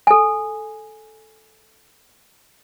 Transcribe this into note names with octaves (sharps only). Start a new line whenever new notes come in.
A4 G#5